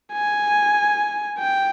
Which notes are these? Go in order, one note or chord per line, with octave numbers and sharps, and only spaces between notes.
G#5
G5